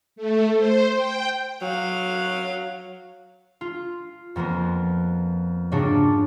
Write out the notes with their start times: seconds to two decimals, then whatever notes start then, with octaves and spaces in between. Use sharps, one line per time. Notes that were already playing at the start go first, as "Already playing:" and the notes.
0.16 A3
0.55 C5
0.92 G5
1.62 F#3 F5
3.61 F4
4.36 F2 F3 A#3 B3
5.72 G#2 C#3 G3 A#3 D4 F#4